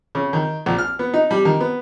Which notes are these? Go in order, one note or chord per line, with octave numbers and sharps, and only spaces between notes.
C#3
D#3
A#1
F6
B3
D#4
G3
D#3
B3